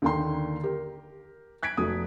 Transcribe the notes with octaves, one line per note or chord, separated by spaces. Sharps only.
D#2 D3 D#3 G5 C6
G4 A#4
F#6 G#6 B6 D7
F1 A3 F#4 D#6